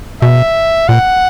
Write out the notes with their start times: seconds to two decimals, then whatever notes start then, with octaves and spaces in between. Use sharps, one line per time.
0.21 B2 E5
0.88 A#2 F#5